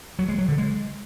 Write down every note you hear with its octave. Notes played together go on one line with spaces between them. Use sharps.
F#3
G#3
F#3
D3
G#3